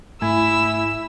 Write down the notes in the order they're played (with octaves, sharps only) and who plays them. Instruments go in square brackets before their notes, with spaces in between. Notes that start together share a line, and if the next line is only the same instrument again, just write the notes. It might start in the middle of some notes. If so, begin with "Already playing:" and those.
[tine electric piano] G#2 G#5 G#6 [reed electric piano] A3 [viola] E4 [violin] E6